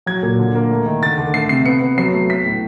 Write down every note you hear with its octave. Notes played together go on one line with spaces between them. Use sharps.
F#3 G#6
A#2
D3
A#3
A3
D#3
D3 A6
D3
A3 C7
C3 C7
B3 C#7
B3
F#3 C7
A3
A3 B6
A2